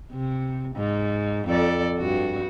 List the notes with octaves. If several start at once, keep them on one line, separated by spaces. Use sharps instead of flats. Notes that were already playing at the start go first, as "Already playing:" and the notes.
C3
G#2
F2 A4 D5
G2 F#4